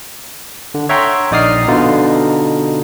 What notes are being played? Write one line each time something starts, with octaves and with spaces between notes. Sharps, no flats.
D3
C#5 E5 F#5 G5 A#5 C6
A#1 D#4 D5 D#6 F6 C7
B2 D3 D#4 F4